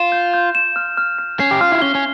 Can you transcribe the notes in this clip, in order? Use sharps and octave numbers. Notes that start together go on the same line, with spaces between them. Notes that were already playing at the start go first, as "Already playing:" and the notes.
Already playing: F4 E7
G6
G6
E7
F6
F6
F6
C#4 C7
G4
F4 F6
E4
C#4 G7
C#4